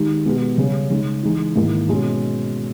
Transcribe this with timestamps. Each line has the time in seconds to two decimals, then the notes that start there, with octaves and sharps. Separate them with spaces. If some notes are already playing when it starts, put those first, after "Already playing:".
Already playing: D#3 G#3 D#4 G4
0.25 B2 G#3 B3 G4
0.58 C#3 G3 C#4
0.90 C#3 G#3 D#4
1.23 E3 G#3 D#4
1.56 G#2 D#3 A#3 E4
1.89 B2 G#3 C#4